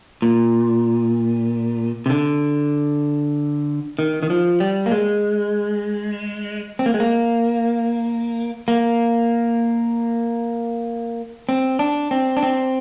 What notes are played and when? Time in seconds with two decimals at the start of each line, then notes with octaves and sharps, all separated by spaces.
0.22 A#2
2.06 C3
2.10 D3
3.99 D#3
4.23 D#3
4.30 F3
4.60 G3
4.86 A#3
4.91 G#3
6.79 C4
6.86 A#3
6.94 G#3
7.00 A#3
8.68 A#3
11.49 C4
11.79 D4
12.11 C4
12.37 D4
12.43 C4